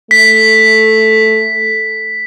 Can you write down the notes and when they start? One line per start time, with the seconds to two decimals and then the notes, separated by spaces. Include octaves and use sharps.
0.11 A3 B6